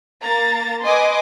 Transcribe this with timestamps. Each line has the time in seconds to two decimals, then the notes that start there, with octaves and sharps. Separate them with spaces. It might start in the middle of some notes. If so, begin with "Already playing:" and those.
0.22 A#3 A#5 A6
0.83 B4 D#5 G#5 C6 D6 D#6